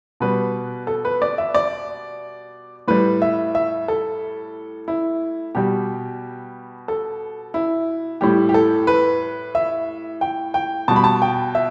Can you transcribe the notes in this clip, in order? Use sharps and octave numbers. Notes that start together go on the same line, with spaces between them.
B2 G3 B4
A4
B4
D5
E5
D5
A2 G3 B4
E5
E5
A4
E4
B2 G3 G4
A4
E4
A2 G3 G4
G4
A4
B4
E5
G5
G5
B2 G3 A5
B5
A5
G5
E5